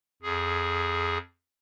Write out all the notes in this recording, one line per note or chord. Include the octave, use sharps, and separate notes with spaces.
F2 G#4